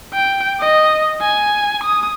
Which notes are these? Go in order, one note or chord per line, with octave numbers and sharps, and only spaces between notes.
G5
D#5
G#5
D#6